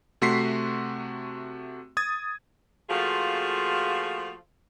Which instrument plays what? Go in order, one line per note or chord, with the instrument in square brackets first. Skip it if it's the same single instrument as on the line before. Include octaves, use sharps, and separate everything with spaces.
[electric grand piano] C3 A3 F#4 C6 B6 C7
D#6 G#6 A6
[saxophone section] F3 A3 A#3 F4 F#4 G#4